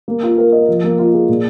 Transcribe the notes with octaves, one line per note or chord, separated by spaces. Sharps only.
A#3
F4
A#4
D#5
F3
A#3
F4
G#4
A#2